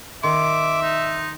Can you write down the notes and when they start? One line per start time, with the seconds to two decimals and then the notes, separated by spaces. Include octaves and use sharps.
0.23 D#3 E5 C6 D6
0.83 D#4